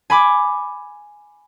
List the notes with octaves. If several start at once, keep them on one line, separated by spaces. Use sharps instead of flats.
G#5 B5 D6